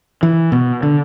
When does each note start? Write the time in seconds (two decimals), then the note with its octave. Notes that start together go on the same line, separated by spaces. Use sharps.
0.23 E3
0.52 B2
0.83 D3